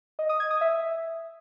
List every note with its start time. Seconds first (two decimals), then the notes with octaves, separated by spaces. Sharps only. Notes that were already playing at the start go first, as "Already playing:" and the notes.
0.19 D#5
0.29 D#6
0.40 G#6
0.51 D#6
0.61 E5